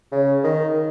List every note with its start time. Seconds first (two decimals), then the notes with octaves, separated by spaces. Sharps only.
0.12 C#3
0.44 D#3